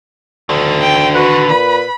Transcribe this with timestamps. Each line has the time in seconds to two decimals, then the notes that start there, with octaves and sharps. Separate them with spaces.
0.49 D2 D3 D#3
0.81 G5
1.15 F#4 B4
1.50 A#2 B5